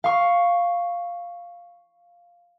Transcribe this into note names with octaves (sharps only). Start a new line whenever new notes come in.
F5 C#6